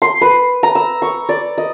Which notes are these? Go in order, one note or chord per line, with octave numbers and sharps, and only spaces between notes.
C6
B4
A#5
E6
C#6
D5
D#5